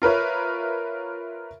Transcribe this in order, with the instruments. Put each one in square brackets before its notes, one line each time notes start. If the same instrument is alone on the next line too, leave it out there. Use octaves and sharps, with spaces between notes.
[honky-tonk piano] F4 A#4 B4 C#5 E5